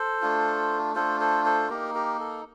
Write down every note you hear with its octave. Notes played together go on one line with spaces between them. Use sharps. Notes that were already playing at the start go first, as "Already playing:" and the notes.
Already playing: A4 C5
A3 D4 F4
A3 D4 F4 A4 C5
A4 C5
A4 C5
A#3 D#4 G4 A#4
G4 A#4
A4